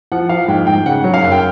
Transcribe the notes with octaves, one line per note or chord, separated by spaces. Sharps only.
F3 F#5
F3 F5
G#2 G5
G#2 G5
C#3 F#5
F#3
F5
F#2
G5